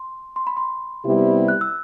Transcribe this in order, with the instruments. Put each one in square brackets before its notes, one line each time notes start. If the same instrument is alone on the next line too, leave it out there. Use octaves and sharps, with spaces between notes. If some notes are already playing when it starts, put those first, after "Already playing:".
Already playing: [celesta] C6
C6
B5
C6
[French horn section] C3 G3 B3 E4 G4
[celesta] F#6
E6